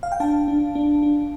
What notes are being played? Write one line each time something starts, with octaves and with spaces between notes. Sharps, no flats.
F5
G5
D4 F5 A5
D4
D4
D4